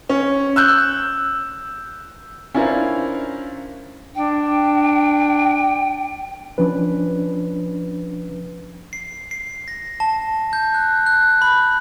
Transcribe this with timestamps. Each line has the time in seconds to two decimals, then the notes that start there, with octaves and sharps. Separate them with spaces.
0.09 C#4
0.56 E6 F#6 G6
2.54 C#4 D4 E4 F4 A#4 C5
4.15 D4 G5
6.58 F3 C#4 D4 B4
8.93 C7
9.31 C7
9.68 A#6
10.00 A5
10.53 G6
10.74 F#6
11.06 F#6
11.42 B5